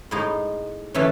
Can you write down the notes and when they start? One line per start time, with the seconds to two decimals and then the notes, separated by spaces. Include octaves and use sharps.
0.11 A2 G#3 D#4
0.94 E3 A3 C#4